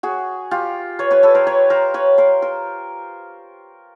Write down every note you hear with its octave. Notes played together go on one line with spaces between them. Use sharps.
F#4 G#4
F4 G4
B4 C#5
B4 C#5
A4 B4
A#4 C5
B4 C#5
A#4 C5
B4 C#5
A#4 C5
A#4 C5